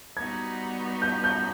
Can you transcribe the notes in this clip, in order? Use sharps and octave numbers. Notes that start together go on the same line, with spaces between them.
G3 B3 D#4 F#4 G#6
G6
G6